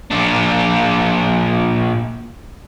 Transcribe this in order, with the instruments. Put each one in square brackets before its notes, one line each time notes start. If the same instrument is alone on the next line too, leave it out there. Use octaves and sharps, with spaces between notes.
[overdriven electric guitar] A#2 D4